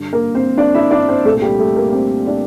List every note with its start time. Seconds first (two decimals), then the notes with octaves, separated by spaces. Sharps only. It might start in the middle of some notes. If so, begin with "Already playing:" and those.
Already playing: G2 D3
0.13 A#3 A#4
0.35 C4 C5
0.57 D4 D5
0.75 E4 E5
0.91 D4 D5
1.08 C4 C5
1.25 C2 A3 A4
1.29 A#2
1.42 G3 G4
1.59 A3 A4
1.76 A#3 A#4
1.93 C4 C5
2.27 D4 D5